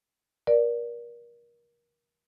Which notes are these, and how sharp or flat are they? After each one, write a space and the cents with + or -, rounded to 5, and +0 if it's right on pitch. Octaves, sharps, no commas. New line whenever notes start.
A#4 +30 D5 +0